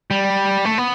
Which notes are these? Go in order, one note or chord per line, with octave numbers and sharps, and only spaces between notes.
G3
A3
B3